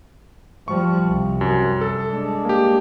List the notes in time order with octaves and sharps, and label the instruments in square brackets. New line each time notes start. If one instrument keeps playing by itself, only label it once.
[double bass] F3 G3 [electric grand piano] C#6
[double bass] C2
[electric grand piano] F#2
A4
[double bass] G#3 D4
[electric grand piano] A#3 G4